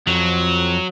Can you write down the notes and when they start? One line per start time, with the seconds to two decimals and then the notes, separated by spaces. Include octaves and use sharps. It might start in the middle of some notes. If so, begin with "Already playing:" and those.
0.07 F2 F#3